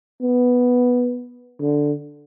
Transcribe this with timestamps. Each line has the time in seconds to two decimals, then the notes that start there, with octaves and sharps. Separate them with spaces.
0.22 B3
1.60 D3